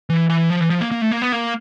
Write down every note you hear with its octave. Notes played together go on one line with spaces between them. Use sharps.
E3
E3
F3
E3
F3
A#3
A#3
A3
A#3
B3
A#3